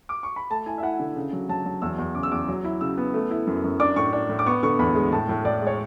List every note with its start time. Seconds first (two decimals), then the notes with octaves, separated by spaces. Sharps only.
0.09 D6
0.23 C#6
0.36 B5
0.50 A3 A5
0.66 E4 G#5
0.78 E5
0.83 E4 F#5
0.99 D3
1.16 C#3
1.33 F#3
1.49 F#3 A5
1.65 F#3
1.82 E2 E6
1.98 E2
2.15 C#3 D6
2.23 E6
2.31 E2 D6
2.48 F#3
2.64 E4
2.81 C#3 E6
2.97 B3
3.14 A3
3.31 E4
3.47 F#2
3.64 F#2
3.80 D4 D6
3.96 A2 C#6
4.13 D4
4.29 A2
4.39 D6
4.46 B3 C#6
4.63 D3 C#6
4.79 E2 B5
4.95 G#3
5.12 A2 A5
5.29 A2
5.45 A2 D5
5.62 G#3 C#5